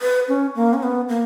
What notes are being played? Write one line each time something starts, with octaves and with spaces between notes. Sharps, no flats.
B4
C#4
A#3
C#4
B3
A#3